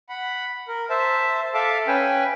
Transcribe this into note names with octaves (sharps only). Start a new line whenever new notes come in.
F#5 B5
A#4
C5 E5 A5
A4 E5 F5 A5 D6
C#4 B4 G5 G#5